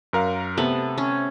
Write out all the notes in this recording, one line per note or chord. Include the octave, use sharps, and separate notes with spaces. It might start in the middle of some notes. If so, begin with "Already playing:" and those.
F#2 A#4 F5
C3 A3 B3
C#4